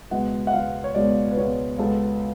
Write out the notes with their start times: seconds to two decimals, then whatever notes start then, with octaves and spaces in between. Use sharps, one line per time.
0.11 C#2 B2 G#3 B3 F#5
0.47 F#5
0.53 C#2 B2 G#3 B3 F5
0.84 C#5
0.95 C#2 B2 G#3 B3 D5
1.31 B4
1.37 C#2 B2 G#3 B3 C#5
1.78 C#2 B2 G#3 B3 A4